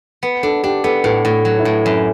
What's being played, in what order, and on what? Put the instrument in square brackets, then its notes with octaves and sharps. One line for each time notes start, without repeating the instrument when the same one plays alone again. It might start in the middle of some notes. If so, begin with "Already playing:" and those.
[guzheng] B3
[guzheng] D4 [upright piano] A4
[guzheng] D4 [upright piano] G4
[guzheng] B3 [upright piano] A4
[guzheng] A2 [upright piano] B4
[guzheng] A2
F#3
[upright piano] E4
[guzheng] A2
F#2